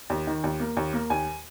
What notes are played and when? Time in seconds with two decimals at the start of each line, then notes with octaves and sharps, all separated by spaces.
0.10 D#2
0.27 D#3
0.44 D#2
0.60 A#3
0.77 D#2
0.93 A#3
1.10 D#2 G#5